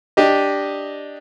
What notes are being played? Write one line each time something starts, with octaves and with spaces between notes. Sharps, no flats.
D4 G4 D#5